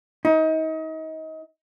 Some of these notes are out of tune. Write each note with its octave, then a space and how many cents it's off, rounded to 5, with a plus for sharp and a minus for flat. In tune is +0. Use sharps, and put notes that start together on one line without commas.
D#4 +30